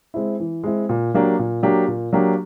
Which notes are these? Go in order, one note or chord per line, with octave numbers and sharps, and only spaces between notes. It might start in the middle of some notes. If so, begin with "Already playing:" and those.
G#3 C4 E4
E3
G#3 C4 E4
A#2
F#3 A#3 D4 G4
A#2
F#3 A#3 D4 G4
A#2
F#3 A#3 D4 G4